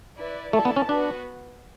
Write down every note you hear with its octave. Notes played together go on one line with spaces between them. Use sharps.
E4 B4 D5
A3 E4 A4 D5 A5
B3
C#4
B3 D4 F#4 B4